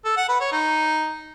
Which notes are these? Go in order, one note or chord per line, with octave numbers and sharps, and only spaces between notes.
A4
F#5
B4
C#5
D#4